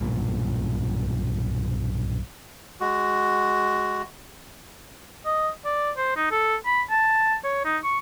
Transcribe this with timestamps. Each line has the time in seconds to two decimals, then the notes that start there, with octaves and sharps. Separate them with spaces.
0.01 B1 G2 A#2
2.80 G#3 F#4
5.25 D#5
5.65 D5
5.97 C5
6.16 D#4
6.31 A4
6.65 B5
6.90 A5
7.44 C#5
7.65 D#4
7.83 C#6